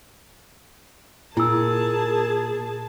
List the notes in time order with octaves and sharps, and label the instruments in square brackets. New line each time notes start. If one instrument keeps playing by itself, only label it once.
[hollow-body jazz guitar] A#2 [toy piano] E4 E6 [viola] G#4 A5 [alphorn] A#4